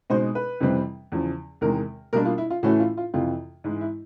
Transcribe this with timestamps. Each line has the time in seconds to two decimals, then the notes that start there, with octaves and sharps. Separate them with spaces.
0.10 B2 G#3 C4 D#4 C5
0.35 B4
0.60 F2 C3 E3 G3 C4
1.12 E2 C#3 F3
1.61 E2 C3 D#3 G#3 A#4
2.13 B2 G3 A#3 D4 A#4
2.25 F4
2.38 E4
2.50 F4
2.63 A2 E3 A3 C#4 F#4
2.80 F4
2.97 F4
3.14 F2 C3 E3 F4
3.64 G#2 E3 G#3
3.81 E4